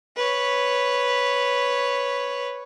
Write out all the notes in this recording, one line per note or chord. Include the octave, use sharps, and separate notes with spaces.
B4 C#5